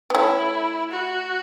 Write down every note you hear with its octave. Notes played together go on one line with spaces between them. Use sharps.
B3
A3 C#4 E4
F#4